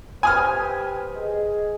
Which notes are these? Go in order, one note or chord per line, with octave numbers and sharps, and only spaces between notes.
G4 B4 C5 G#5 D#6 F6
G#4 D#5